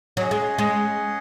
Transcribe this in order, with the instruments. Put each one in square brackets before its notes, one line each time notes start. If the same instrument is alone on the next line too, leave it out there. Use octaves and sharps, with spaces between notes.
[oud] F#3 [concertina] C#4 G#4 D#5 F#5
[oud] G#3
G#3